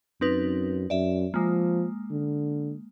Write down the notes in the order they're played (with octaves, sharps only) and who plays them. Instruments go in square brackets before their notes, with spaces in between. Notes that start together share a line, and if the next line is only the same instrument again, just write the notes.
[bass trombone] F#2 [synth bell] C4 D#4 B4
[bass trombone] F#2 [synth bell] D5 E5
[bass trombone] F3 [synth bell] G#3 A#3
[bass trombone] D3